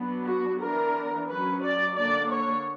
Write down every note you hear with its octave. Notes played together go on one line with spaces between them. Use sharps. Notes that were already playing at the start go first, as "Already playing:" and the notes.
Already playing: F#3 B3 D4
F#4
E3 B3 D4 A#4
F#3 C#4 B4
D5
D3 A#3 D4 D5
C#5